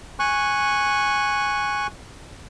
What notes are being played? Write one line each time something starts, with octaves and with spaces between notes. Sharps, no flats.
G#5 C#6 F#6